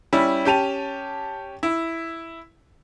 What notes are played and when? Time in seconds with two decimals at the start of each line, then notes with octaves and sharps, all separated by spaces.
0.13 G3 C#4 E4
0.45 C#4 G4 A5 D#7 F7
1.63 E4